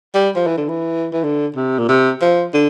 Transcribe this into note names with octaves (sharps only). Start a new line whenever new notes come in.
G3
F3
E3
D3
E3
E3
D3
C3
A#2
C3
F3
D3